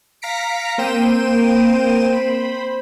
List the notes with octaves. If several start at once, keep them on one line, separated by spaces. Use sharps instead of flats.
F5 A#5 A#6 B6 C#7 D7
A#3 C4 C5 G5 D#7 E7
C5 B5